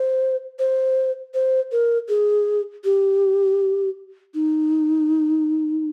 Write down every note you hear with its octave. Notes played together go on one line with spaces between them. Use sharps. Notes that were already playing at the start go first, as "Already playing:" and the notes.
Already playing: C5
C5
C5
A#4
G#4
G4
D#4